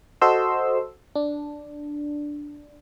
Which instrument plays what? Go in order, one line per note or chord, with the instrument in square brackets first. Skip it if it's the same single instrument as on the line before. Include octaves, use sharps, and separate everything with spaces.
[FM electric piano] F#4 A4 C5 D#5 C6 E6
D4